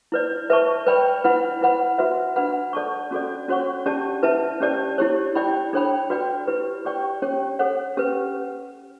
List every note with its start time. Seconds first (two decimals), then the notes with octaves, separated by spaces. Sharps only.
0.12 E4 B4 D5
0.50 B4 E5 A5 C#6
0.87 B4 D5 G5 B5
1.24 E4 B4 F#5 B5
1.61 E4 B4 F#5 B5
1.98 F#4 B4 E5
2.36 D4 F#4 B4 F#5 B5
2.73 A4 D5 A5 C#6
3.11 C#4 F#4 A4 D5
3.48 C#4 F#4 C#5 F#5 C#6
3.86 C#4 G4 D5 A5
4.23 E4 B4 E5 A5
4.60 C#4 G4 D5 A5
4.98 E4 G4 C#5
5.35 E4 G4 D5 G5 B5
5.73 D4 A4 C#5 G5 B5
6.10 F#4 B4 D5 G5
6.48 E4 G4 B4
6.85 G4 D5 G5 C#6
7.22 C#4 G4 C#5 G5
7.59 A4 C#5 F#5
7.97 C#4 G4 B4